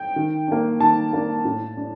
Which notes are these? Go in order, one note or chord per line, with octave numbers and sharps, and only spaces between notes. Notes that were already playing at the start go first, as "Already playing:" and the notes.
Already playing: G5
D#3
A#3 D4
D#3 A5
A#3 D4
A2
D4